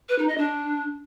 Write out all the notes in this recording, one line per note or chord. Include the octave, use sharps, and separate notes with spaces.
B4
D#4
D#5
D4